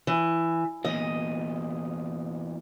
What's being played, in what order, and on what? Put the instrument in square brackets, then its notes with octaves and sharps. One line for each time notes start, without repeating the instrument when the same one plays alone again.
[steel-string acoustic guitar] E3
[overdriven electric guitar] E2 A#2 [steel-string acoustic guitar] D#5